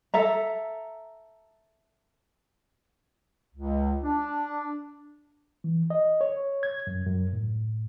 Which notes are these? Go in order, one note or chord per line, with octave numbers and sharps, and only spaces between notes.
A4 E5 A#5
C#2
D4
E3
D#5
C#5
G#6
F#2
F#2
A2